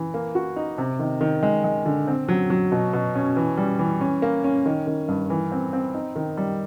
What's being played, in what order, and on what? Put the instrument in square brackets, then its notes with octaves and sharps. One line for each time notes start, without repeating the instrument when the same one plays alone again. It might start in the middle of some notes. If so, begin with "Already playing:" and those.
Already playing: [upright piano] E3
A#3
F#4
D#4
C3
D#3
D#3
G#3
G#3
D3
C4
F#3
F#3
B2
B2
C#4
E3
G3
E3
C#4
A#3
C#4
D#3
D#3
G2
E3
C4
C4
D#4
D#3
G3